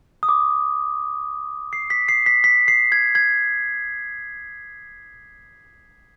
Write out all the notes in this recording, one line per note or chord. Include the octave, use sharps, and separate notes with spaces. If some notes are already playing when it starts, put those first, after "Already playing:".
D#6
D6
C7
B6
C7
B6
B6
C7
G#6
G#6